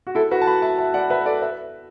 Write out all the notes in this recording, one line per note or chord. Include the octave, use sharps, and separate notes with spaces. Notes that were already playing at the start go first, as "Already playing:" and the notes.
F#4
E4 A4
F#4 B4
A5
F#5 B5
E5 A5
E5 A5
D5 F#5
B4 E5
A4 D5
B4 E5